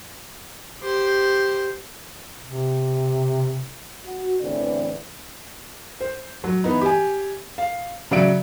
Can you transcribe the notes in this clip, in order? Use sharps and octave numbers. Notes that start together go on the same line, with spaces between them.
G4 C5
C3
F#4
E2 A2 D3 E3 C4 D5
C5
F#3
E3 B3 D#4
G4 G#5
F5
C#3 F#3 D5 E5 C#7 D7